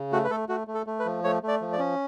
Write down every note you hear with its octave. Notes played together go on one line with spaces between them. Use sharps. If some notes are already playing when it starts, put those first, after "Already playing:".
Already playing: C#3
A3 F#4
B4
A3 A4
A3 F#4
A3
A4
A3
B4
F3
A3 C#5
A3
D5
F3
D5
C#4